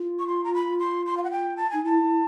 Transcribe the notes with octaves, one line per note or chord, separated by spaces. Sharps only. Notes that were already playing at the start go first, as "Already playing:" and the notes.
Already playing: F4
C#6
C6
A#5
B5
C6
C6
F5
F#5
G5
A5
D#4 G#5
E4 A5
E4